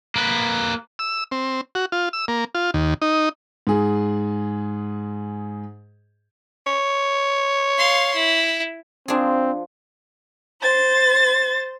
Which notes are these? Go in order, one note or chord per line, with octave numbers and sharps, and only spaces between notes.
A#3 B4
E6
C4
F#4
F4
E6
A#3
F4
D#2
D#4
G#2 G#4
C#5
F5 C6
E4
F3 C4 D4 G#4
C5 A6